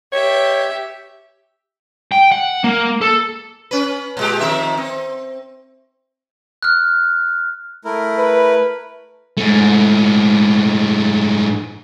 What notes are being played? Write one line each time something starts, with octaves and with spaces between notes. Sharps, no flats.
G4 C#5 E5
G5
F#5
A#3
A4
C#4 B4
A#2 G#3 G4
F2 D#3 E5
C4
F6 F#6
A3 E4 A#4
B4
G#2 A3